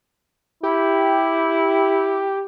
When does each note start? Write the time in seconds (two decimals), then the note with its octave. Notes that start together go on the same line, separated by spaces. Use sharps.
0.63 E4 G4